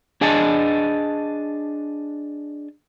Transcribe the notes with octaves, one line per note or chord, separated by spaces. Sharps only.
D4 G#4 D#5 A5